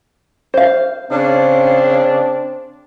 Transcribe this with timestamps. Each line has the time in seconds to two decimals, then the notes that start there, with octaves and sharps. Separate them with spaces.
0.54 C5 F5
1.11 C#3 C4 D4